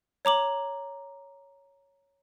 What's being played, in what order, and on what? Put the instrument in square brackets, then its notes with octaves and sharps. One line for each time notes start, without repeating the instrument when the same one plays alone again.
[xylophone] C#5 A#5 D6 F#7